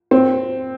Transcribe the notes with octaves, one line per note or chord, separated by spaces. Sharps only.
C4